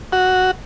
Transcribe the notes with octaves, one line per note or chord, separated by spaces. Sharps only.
F#4